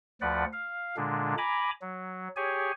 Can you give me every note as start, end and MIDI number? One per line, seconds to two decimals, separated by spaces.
0.21 0.45 38
0.21 0.45 53
0.21 0.45 71
0.21 0.45 74
0.21 0.45 78
0.53 0.96 77
0.97 1.35 46
0.97 1.35 50
0.97 1.35 56
0.97 1.35 62
1.38 1.71 80
1.38 1.71 82
1.38 1.71 83
1.38 1.71 86
1.82 2.28 54
2.36 2.72 67
2.36 2.72 68
2.36 2.72 73
2.36 2.72 80